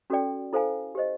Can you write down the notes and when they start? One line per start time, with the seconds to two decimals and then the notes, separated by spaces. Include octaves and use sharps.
0.10 C#4 F#4 A4 D5 G5
0.53 E4 A4 C5 F5 G#5
0.95 G4 C5 D#5